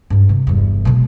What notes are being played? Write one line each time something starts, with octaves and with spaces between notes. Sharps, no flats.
G2 G#3
C3
G1 E2
B2 G#3